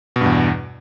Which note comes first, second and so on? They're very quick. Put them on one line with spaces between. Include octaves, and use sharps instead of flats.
B2 G2 E2